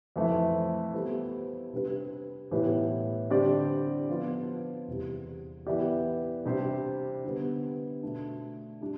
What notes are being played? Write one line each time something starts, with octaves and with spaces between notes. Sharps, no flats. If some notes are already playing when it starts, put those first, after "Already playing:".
F2 E3 A3 C4 E4
G3 B3 F4 A4 C5
C3 G3 D4 G4 B4
A2 E3 B3 E4 G4
D3 G3 C4 G4 D5
F3 B3 F4
E2 C3 G3
E3 B3 E4 G4 D5
C3 G3 D4 G4 C5
D3 G3 B3
B2 A3 D4
G3 D4